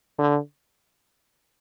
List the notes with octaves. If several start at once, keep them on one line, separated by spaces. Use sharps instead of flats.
D3